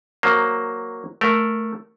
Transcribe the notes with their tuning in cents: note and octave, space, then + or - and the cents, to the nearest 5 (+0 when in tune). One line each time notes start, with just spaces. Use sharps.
F#3 +0 A#3 +0 C5 +0
A3 +0 A#4 +0